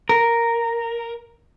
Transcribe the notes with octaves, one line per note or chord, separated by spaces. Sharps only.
A#4